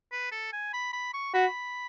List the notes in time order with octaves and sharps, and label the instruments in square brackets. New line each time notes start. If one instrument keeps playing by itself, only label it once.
[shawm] B4
A4
G#5
B5
B5
C#6
[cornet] F#4 [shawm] B5